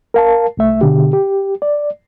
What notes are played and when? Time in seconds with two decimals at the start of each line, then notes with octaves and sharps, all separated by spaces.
0.14 A#4 F5 A5
0.57 C2 A3 E5
0.81 B2 D3 G4
1.13 G4
1.62 D5